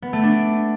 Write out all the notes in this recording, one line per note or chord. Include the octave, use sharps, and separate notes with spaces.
B3
A3
D4